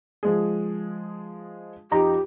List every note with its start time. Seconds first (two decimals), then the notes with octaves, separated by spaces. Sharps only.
0.23 F3 G#3 G#4
1.91 F2 D#4 G4 A#5